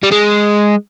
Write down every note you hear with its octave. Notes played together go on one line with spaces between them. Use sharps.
G3
G#3